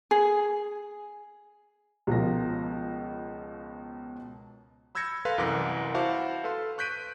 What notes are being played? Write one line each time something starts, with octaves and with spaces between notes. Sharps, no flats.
G#4
C#2 B2 F3 A#4 A#6
B5 E6 G6 G#6 A#6 C#7
A4 B4 F5 C6
C2 F#2 E3 D6 A#6
E4 F#4 C5 F5 A5 D6
A4 B4 F5 C6
C#6 F#6 G6 B6 D7 D#7